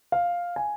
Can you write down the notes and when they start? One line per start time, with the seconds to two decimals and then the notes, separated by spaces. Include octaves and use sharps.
0.12 F5
0.56 G#5